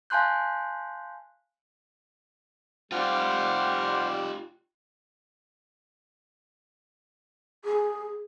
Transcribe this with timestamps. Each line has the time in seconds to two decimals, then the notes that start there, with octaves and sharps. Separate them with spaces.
0.10 F5 G#5 A5 C6 F#6 G6
2.92 G3 F4 G4 C5 F#5 F6
7.65 G#4